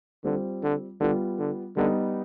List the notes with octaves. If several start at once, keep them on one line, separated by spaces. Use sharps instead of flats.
D3 G3 C4 F4
D3
D3 G3 B3 F4
D3
D3 G3 B3 D#4